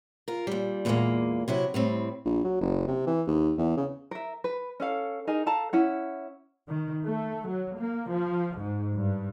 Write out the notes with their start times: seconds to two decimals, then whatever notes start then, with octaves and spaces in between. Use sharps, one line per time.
0.28 F4 A#4
0.47 A#2 G3
0.85 E2 A#2 D#3 G3 G#3 A#3
1.48 C3 F#3 E4
1.74 A2 G3 C4
2.26 A#1
2.44 F#3
2.61 F#1
2.87 C3
3.07 E3
3.28 D#2
3.58 E2
3.77 C#3
4.11 A#4 E5
4.44 B4
4.80 C#4 A4 F5
5.27 D#4 G#4 A#4 G#5
5.46 A4 F5 A5 A#5
5.73 C#4 E4 F#5
6.68 D#3
7.04 A3
7.47 F#3
7.77 A#3
8.09 F3
8.57 G#2
8.96 G2